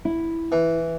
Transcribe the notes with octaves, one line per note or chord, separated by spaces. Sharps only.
E4
E3